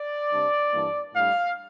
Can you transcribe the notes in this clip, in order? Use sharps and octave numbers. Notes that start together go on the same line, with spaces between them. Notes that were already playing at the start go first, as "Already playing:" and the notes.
Already playing: D5
C3 G3 D4
G2 E3 A#3 D4
A2 G3 D4 F5